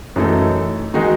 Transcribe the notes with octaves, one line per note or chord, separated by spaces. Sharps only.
F#2 E3 A3 D#4 A4
D#3 G#3 D#4 F#4